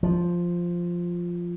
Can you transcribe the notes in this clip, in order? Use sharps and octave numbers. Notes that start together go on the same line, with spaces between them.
F3